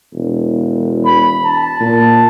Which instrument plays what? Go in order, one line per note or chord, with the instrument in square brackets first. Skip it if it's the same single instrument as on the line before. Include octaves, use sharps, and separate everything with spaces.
[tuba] E1
[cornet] B5
A5
[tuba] A#2